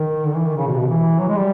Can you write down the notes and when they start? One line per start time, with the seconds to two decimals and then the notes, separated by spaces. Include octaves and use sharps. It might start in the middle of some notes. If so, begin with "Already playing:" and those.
Already playing: D#3
0.25 D3
0.35 E3
0.46 D#3
0.57 C#3
0.67 B2
0.73 C3
0.77 B2
0.88 E3
1.19 F#3
1.29 G#3
1.36 G3